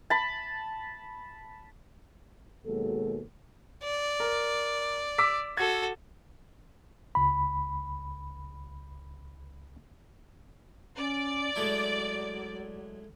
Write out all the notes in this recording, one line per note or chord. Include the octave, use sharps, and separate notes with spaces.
A5 B5
D#2 B2 F#3 G#3 A#3 A4
D5
A#4
D6 E6 B6
F#4 A4 G#6
C#2 B5
C#4 D5
F#3 G#3 A3 E4